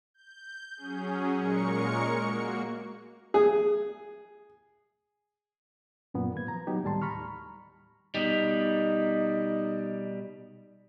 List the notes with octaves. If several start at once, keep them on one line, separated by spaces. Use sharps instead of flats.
G6
F#3 C#4 G#4
A#2 G#3 A#4 C#6 C#7
A#3 F#4
G#4
F#2 A#2 B3
G#2 F3 B4 G#6
A#5
F#3 B3 D#4 G4
D#2 A2 G3 A5 C6
A#5 B5 C#6 F6
B2 G3 D#4